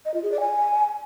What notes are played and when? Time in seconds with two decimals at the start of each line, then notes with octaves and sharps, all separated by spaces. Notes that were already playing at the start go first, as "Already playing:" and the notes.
0.05 D#5
0.14 F4
0.23 G#4
0.32 D5
0.40 G#5